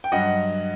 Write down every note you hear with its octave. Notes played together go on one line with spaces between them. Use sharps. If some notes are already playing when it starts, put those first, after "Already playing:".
G5
G2 F#3 D#5 F#5